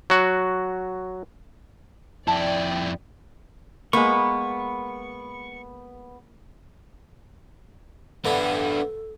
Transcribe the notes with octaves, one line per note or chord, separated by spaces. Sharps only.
F#3 F#4
F2 E4 D5 G5 A5
G#3 A#3 B3 C#6
D3 E3 B3 D4 A4 B4